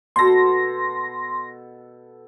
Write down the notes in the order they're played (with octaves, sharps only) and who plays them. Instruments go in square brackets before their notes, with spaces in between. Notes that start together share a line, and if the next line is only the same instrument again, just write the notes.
[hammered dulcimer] B2 A4 [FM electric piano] C6 A#6